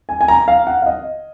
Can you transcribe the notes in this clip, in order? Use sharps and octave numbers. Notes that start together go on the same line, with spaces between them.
G#5
G#5
A#5
F5
F#5
F5
D#5